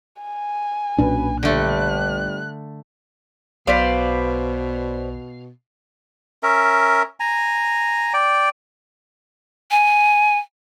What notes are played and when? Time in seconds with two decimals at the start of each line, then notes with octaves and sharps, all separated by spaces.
0.22 G#5
0.98 B1 A#2 C#4 D4 F#4 B4
1.43 G1 D3 G3 A3 F#6
3.67 B1 B2 B4 C5 D5 F5
6.43 C#4 A#4 E5
7.20 G#5 A#5
8.14 D5 G5
9.71 G#5